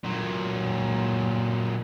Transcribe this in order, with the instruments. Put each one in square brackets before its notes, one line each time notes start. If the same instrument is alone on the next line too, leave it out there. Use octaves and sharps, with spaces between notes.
[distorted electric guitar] A#2 F#3